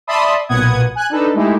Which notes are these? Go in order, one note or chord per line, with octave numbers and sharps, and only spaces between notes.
D5 E5 A5 B5 C6 D#6
B1 A#2 B3 F#5 D#6 G#6
G#5 F#6
D4 D#4 A4 B4
G#3 A3 D#4 E4 G4